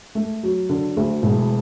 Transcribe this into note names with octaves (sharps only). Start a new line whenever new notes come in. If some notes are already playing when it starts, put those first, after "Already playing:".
A3
F#3
D3
D2
E1